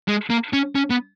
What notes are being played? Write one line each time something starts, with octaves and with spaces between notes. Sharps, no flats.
G#3
A#3
C#4
C#4
B3